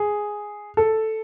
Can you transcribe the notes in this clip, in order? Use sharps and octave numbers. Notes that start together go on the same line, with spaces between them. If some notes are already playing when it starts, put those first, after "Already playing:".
Already playing: G#4
A4